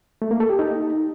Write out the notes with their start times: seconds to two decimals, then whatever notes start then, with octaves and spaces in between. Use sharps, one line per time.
0.22 A3
0.31 A#3
0.40 A4
0.50 G4
0.59 D#4